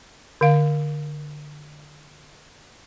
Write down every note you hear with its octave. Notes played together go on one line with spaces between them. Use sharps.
D3 F5